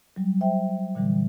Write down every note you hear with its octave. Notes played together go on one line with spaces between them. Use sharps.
F#3 G3
C5 E5 G5
A#2 D3 E3 G3